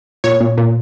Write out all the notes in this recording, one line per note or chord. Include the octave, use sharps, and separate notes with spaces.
A#2 C#5
A#2
A#2